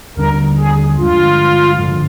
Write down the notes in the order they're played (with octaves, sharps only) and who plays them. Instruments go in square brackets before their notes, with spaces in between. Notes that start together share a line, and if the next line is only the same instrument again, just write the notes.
[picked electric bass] D#2 D3 G3 [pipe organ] A#4
[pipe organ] G#4
[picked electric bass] G2 D3 F3 G#3 [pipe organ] F4
[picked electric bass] G#1 G2 D3 F3